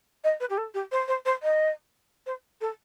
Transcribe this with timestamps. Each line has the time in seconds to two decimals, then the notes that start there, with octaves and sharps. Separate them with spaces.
0.24 D#5
0.40 B4
0.49 G4
0.57 A4
0.74 G4
0.91 C5
1.07 C5
1.25 C5
1.43 D#5
2.26 C5
2.61 A4